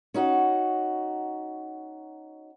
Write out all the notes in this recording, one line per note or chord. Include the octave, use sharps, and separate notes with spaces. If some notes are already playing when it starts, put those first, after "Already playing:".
C#4 D#4 F#4